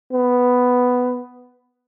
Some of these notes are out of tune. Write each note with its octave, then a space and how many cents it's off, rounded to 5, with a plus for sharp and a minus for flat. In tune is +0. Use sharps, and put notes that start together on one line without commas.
B3 +5